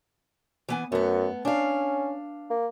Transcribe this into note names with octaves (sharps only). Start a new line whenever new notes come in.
E3 B3 G#5
F#2 A3 B3
C#4 D4 F5
A#3